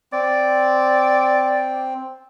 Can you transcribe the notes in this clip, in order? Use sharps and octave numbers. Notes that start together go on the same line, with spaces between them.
C4 D5